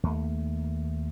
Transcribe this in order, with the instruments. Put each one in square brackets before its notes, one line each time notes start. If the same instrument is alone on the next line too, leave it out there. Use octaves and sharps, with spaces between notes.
[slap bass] D#2 A3